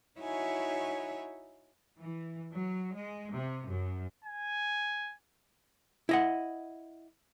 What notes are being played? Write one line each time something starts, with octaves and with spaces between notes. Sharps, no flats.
D#4 E4 F#4 C#5 E5 G#5
E3
F#3
G#3
C3
F#2
G#5
E4 D#5 F#5